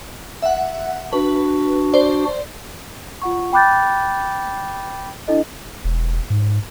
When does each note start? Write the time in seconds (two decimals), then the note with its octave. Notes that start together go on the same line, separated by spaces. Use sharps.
0.42 E5 F#5
1.13 D4 F#4 B4
1.93 C5 D5
3.22 F4 F#5 C#6
3.53 G5 B5 D6 F#6 G6 A6
5.28 D4 E4 A4 D#5
5.84 E1
6.30 G#2